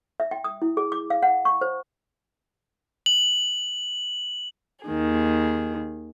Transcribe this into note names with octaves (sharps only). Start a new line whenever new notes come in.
E5
G5
D#6
E4
G#4
D6
F5
F#5
C#6
C5
F#7
D#2 D#3 G#4